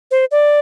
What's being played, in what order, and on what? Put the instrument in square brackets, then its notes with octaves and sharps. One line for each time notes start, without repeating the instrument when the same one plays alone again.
[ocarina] C5
D5